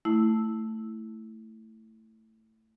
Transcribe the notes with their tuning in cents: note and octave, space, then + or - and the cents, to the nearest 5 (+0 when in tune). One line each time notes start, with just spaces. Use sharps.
A3 +10 E4 +0